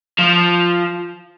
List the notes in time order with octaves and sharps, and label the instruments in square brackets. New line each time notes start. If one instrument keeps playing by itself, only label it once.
[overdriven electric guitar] F3